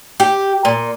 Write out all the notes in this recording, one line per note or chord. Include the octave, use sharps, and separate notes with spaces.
G4
A#2